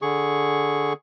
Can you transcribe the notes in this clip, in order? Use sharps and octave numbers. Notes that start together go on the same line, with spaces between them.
D3 G#4 C#6